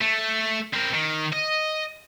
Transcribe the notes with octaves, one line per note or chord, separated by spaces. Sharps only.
A3
C4 A#4
D#3
D#5